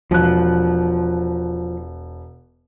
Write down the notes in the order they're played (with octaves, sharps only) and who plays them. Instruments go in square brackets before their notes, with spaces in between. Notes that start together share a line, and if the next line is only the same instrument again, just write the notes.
[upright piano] E1 F#6 [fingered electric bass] F3